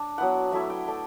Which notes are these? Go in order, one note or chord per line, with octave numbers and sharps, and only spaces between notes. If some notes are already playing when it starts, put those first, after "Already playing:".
Already playing: D4
F#3 B3 E4 F#5
F#3 A3 E4 E5
G5
A3 D4